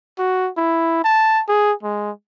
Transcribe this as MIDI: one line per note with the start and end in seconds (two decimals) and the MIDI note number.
0.19 0.50 66
0.57 1.01 64
1.04 1.43 81
1.49 1.72 68
1.83 2.11 56